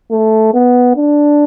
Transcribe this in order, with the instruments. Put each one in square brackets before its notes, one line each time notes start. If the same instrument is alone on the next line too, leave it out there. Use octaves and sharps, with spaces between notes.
[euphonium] A3
B3
D4